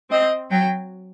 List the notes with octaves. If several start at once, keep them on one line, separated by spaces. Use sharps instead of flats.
C4 D#5
F#3 G5